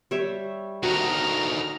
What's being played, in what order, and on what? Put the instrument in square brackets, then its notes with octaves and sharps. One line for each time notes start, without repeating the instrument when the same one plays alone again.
[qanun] G3 C#5 E5
[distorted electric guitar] D2 D#3 [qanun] F#4 [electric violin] A#5 F6